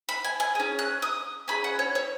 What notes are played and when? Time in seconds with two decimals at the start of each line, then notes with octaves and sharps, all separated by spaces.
0.09 B5
0.24 G#5
0.40 G#5
0.55 C#4 G#4
0.79 F#6
1.02 D#6
1.48 C#4 G#4 B5
1.64 F#5
1.79 C#5
1.95 C#5